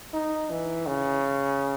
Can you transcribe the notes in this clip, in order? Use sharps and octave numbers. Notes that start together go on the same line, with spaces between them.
D#4
E3
C#3